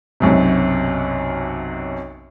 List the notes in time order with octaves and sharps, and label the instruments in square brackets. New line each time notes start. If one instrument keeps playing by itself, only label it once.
[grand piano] B1 F#2 C3